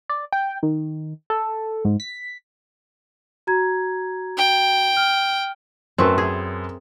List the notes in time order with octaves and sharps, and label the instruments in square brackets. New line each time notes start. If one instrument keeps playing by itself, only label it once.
[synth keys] D5
G5
D#3
A4
G#2
B6
[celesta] F#4 A#5 G#6
[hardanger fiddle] G5
[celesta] F6
[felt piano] F#2 B4 [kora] A3 C4
[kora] G#4